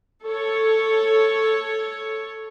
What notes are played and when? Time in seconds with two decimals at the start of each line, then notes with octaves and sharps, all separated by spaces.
0.23 A4 C#5